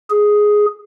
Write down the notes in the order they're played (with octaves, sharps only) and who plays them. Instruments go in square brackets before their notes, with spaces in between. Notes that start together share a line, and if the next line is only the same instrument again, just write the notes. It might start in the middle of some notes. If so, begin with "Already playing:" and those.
[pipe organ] G#4